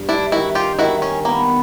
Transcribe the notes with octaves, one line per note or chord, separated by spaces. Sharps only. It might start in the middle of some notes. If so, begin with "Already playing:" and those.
Already playing: G2
D4 E4
D#3 E4 F#4
F4 G4
D#3 E4 F#4
C#4
A#3 B3